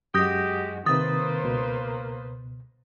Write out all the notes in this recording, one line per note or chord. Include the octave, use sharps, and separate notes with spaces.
F#2 G#3 F#4 G4 D#6 G6 A#6
C3 D#3 A#3 B4 C5 D#6 A6
C#2 B2